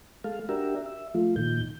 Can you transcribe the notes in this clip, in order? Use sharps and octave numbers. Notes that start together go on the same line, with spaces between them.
G#3 A4 F5
D4 F#4 G4 A#4 E5
E5
F3 A3 F4
A#2 D#3 G6